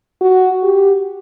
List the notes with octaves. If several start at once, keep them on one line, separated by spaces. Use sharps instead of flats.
F#4
G4